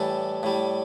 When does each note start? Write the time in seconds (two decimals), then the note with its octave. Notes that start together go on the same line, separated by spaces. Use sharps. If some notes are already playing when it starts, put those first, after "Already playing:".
Already playing: A2 E3 G3 A4
0.43 A2 G3